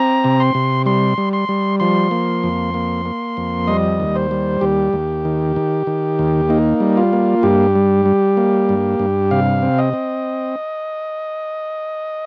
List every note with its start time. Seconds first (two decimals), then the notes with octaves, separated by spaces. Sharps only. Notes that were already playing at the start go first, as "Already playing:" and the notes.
Already playing: C4 A#5
0.24 C3
0.40 C6
0.55 C3
0.86 G3 C6
1.18 G3
1.33 C6
1.49 G3
1.80 F3 C6
2.11 A#3
2.43 F2
2.74 A#3
3.06 A#3
3.37 F2
3.67 G3 D#5
4.00 D#2
4.16 C5
4.31 G3
4.61 D#2 G4
4.93 D#2
5.25 D#3
5.56 D#3
5.87 D#3
6.19 D#2
6.49 A#3 D#4
6.80 G3
6.97 F4
7.13 A#3
7.43 G2 G4
7.75 G3
8.06 G3
8.37 A#3
8.69 G2
8.99 G2
9.31 C3 F5
9.62 C4
9.78 D#5
9.94 C4